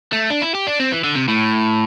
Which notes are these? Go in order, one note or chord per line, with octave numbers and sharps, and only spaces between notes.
A3
D4
E4
G4
D4
C4
E3
D3
C3
A2